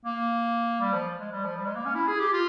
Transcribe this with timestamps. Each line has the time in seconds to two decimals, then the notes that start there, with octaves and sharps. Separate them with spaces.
0.05 A#3
0.81 G3
0.94 F3
1.19 G#3
1.31 G3
1.44 F3
1.57 G3
1.66 G#3
1.75 A#3
1.85 C#4
1.95 E4
2.08 G#4
2.20 G4
2.33 F4